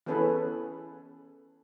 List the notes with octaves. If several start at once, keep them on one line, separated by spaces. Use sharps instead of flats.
E3 B3 C#4 G#4 A4 B4